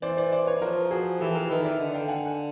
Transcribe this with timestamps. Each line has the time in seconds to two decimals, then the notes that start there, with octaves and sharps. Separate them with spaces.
0.02 E3 C5 D5
0.17 C5 D5
0.32 C5 D5
0.47 B4 C#5
0.61 F3 A#4 C5
0.91 F#4 G#4
1.20 E3 G4 A4
1.35 G#4 A#4
1.50 D#3 A4 B4
1.64 D5 E5
1.79 D3
1.94 F5 G5
2.08 F#5 G#5
2.26 F#5